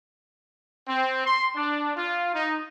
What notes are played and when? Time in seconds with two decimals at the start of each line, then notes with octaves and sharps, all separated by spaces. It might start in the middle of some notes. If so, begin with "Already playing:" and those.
0.88 C4
1.26 C6
1.56 D4
1.96 F4
2.35 D#4